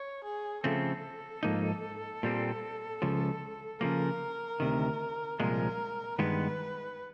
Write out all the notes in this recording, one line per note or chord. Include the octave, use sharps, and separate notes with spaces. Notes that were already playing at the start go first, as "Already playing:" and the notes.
Already playing: C#5
G#4
C#3 F3 A3 C4 A4
G#2 F3 A#3 D#4
A#2 G3 C4
C#2 C#3 F3
C#3 F3 A#3 A#4
D2 C3 D#3
C2 A#2 F3 G#3 A#4
G2 D#3 G#3 B3 B4